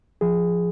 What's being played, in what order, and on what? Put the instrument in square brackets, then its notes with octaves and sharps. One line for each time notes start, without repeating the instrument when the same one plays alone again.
[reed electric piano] F3 G#4